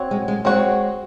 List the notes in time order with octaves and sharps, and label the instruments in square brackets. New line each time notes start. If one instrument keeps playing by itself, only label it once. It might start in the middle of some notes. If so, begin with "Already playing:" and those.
Already playing: [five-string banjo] C4 F#4 C#5
[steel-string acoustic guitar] G#3
G#3
[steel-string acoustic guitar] G#3 [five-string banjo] C4 F#4 C#5